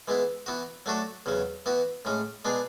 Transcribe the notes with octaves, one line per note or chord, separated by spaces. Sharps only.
E3 G#3 B3 E4
E3 B3 F#4
F#3 A3 D4 F#4 A4
E2 C#3 F#3
E3 B3 F#4
A2 G#3 C#4
B2 G#3 B3 D4 G#4